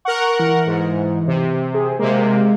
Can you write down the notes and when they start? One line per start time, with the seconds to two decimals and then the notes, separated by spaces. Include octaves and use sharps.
0.05 A#4 F#5 C#6
0.39 E3
0.66 G#2
1.27 C3
1.74 G#4
1.99 C3 G#3 A#3